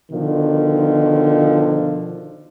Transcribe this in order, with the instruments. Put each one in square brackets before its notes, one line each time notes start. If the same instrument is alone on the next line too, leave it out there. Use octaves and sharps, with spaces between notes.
[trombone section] B2 D3 D#3 F3